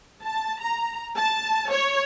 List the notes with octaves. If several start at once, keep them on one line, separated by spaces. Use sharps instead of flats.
A5
A#5
A5
C#5